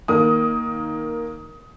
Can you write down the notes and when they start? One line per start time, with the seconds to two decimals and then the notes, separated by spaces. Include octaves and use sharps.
0.08 D#3 A#3 D#6